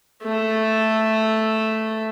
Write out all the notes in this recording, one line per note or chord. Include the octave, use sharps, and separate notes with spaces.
A3 A4